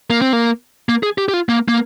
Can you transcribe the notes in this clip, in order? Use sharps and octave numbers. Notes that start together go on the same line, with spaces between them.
A#3
C4
A#3
A#3
G#4
G4
G4
F4
A#3
A#3